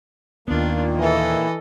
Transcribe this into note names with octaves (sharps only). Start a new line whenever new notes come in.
D#2 A#2 D#3 A#3 B3 D4 F4
E3 A4 D#5